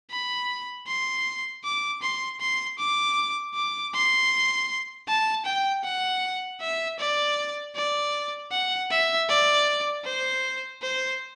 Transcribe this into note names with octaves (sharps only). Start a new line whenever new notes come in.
B5
C6
D6
C6
C6
D6
D6
C6
A5
G5
F#5
E5
D5
D5
F#5
E5
D5
C5
C5